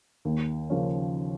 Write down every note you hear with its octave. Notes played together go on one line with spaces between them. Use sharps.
D#2
C#3 F3 A#3 C#4